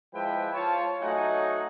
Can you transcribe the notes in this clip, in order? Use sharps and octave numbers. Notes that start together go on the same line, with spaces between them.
F3 G#3 E4 B4 G5
F4 C#5 A5
F#3 A3 D#4 D#5 F#5 G#5